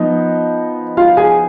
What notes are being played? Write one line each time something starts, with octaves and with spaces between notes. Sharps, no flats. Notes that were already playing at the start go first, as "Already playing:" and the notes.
Already playing: F3 B3 D#4 D#5
F4 F5
G#4 G#5